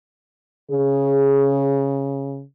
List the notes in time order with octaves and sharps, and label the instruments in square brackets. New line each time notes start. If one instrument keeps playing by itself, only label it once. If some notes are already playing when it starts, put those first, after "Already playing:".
[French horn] C#3 [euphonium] G#4